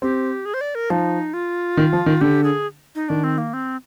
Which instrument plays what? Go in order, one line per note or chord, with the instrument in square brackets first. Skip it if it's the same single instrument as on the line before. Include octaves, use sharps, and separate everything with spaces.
[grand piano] C4 [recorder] G4
[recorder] G#4
C5
D5
A#4
[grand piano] F3 [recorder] D#4
[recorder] F4
[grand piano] D#3
F3
D#3
[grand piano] D3 [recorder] G4
[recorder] G#4
D#4
[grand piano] D#3 [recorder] D4
[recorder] C4
A#3
C4